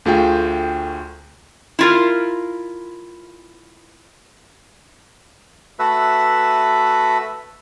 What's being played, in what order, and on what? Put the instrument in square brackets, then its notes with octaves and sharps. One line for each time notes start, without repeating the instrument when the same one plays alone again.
[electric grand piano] D2 A3 F4 G#4 G5
[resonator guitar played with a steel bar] E4 F4 A#4
[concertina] A3 F#4 B4 E5